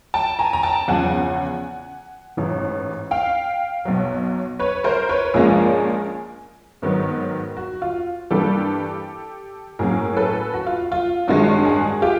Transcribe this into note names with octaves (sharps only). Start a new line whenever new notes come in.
G5 A5
G#5 A#5
A#5
G5 A5
E2 C#3 F3 F#5 G#5
A1 G#2 E3
F5 G5
B1 B2 F#3
B4 C#5
A#4 C5
B4 C#5
A#1 A#2 F3 G#3 C#4 G#4 A#4
G#2 D#3 F#3 B3
F#4
F4
G2 E3 G3 A#3 G4 A4
A2 F#3 A#3 C#4 G#4 A#4
A4 B4
F#4
F4
F4
A1 G2 D#3 G#3 F#4
F#4 G#4
F4 G4